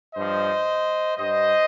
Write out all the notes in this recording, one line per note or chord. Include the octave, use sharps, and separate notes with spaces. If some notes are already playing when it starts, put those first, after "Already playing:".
G2 F3 C5 D#5
G2 G3 C5 D#5